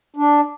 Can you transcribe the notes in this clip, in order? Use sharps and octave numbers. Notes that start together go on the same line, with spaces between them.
D4